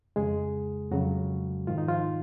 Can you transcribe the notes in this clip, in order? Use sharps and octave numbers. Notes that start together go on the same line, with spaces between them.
F2 C#3 G#3 G#4
F2 C#3 F#3 F#4
G#2 D#3 F4
D#4
F3 F4